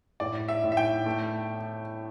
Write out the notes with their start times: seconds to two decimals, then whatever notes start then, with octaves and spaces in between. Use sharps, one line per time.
0.20 A2 D5
0.48 E5
0.64 A2
0.72 E5
0.77 G5
1.06 A3